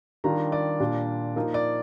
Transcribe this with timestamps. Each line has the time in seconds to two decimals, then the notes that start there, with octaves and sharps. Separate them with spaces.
0.24 D#3 G3 D4 F4 A#5
0.52 D5
0.80 A#2 G3 D4 F4
1.36 F3 A#3 D#4
1.54 D5